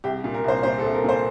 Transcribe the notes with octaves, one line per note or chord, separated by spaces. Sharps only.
C2 G4
A#2
A#4
C2 C5
A#2 C5
A4
C2
A#4
A#2 C5